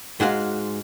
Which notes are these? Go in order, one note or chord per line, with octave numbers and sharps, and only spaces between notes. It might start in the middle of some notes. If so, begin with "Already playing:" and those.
G#2 G#3 F#4 F5